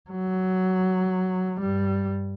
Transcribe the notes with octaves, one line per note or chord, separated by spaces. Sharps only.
F#3
G2 G3